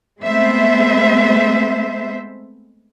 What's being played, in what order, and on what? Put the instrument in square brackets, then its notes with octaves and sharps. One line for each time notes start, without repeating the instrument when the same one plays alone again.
[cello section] G#3 A3 B3 C4 C5 E5